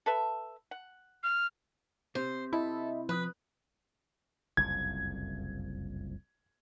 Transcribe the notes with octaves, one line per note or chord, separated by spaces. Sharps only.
A4 B4 E5
F#5
F6
C3 C5
E4 A4 D#5 E5 B5
F3 B4 D#6 F#6
F#1 C2 F2 G#6